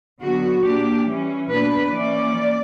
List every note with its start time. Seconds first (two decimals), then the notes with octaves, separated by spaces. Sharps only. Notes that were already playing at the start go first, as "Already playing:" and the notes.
0.21 D3 F#3 B3 F#4
0.63 A#2 A#3 D4 G4
1.06 E3 G3 C#4
1.50 B2 A#3 D4 B4
1.93 E3 A#3 C#4 D5